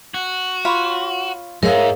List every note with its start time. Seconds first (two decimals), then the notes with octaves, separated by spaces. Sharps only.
0.14 F#4
0.65 F4 C#5 B5
1.63 G#2 G#3 A#4 C#5 E5 F5